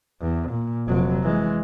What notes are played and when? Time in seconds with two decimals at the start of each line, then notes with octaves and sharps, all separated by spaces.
0.22 E2
0.50 A#2
0.88 F1 F#3
1.23 E3 G#3